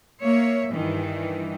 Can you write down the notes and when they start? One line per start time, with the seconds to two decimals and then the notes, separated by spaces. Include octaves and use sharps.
0.20 A#3 C#5 E5
0.72 G2 D#3 E3